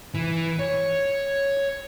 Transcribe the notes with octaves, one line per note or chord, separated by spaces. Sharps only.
E3
C#5